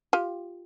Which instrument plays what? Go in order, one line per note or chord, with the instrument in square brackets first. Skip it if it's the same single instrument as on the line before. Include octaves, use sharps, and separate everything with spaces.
[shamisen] F4 G4